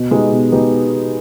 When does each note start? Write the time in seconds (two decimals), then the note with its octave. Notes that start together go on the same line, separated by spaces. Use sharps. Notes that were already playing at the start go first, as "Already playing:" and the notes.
Already playing: B2
0.11 G#3 B3 D#4 G4
0.31 B2
0.52 G#3 B3 D#4 G4